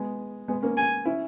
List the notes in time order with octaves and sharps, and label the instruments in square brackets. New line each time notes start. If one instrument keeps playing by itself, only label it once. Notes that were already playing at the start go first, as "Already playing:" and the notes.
Already playing: [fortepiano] G#3 B3
G#3 B3
A#3 C#4
[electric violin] G#5
[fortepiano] C#4 E4